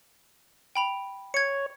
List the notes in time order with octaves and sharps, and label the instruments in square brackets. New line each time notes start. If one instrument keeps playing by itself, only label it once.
[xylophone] G5 B5 F7
[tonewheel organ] C#5 [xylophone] G#6 C#7